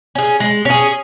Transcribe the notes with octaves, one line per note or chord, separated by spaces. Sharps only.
C#4 G#4
G#3
C#4 G#4